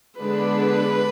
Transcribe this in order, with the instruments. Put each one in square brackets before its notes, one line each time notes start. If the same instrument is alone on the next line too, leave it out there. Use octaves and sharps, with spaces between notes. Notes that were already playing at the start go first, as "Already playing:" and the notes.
[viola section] D3 G#3 B3 D4 B4